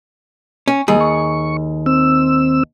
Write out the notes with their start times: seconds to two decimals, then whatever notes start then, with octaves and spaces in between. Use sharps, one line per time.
0.68 C#4
0.88 D#2 G3 G#4
1.01 C#6
1.86 C4 E6